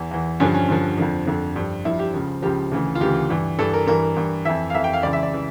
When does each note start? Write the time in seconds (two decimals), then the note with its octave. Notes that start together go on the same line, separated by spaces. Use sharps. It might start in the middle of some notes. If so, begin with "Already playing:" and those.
Already playing: E2 E3
0.11 E2 E3
0.40 G2 D3 F3 C#4
0.54 C#4
0.69 G2 D3 F3
0.98 F2 D3 F3
1.27 F2 D3 F3
1.56 G2 F3
1.85 G2 F3 E4
1.99 G4
2.14 C#2 C#3 F3
2.42 C#2 C#3 F3 G4
2.72 D2 C#3 E3
2.95 F4
3.01 D2 C#3 E3 G4
3.30 G2 E3
3.59 G2 E3 A4
3.74 A#4
3.87 G2 E3 A#4
4.16 G2 E3
4.45 F2 E3 E5
4.70 F5
4.75 F2 E3 E5
4.84 G5
4.93 F5
5.03 C#2 C#3 E3 D5
5.13 E5
5.23 D5
5.33 C#3 E3